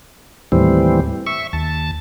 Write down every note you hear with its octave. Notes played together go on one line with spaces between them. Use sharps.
D#2 A2 E3 G3 C4
E5 C#6
D#2 A5